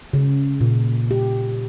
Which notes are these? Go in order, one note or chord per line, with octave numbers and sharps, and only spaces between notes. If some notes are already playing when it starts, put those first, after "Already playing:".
C#3
A#2
G4